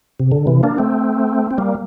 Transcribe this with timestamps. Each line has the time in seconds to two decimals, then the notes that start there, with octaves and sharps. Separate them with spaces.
0.20 C3
0.32 D3
0.47 C3 E3
0.63 A#3 D4
0.78 A3 C4
1.51 C4
1.58 G3 A#3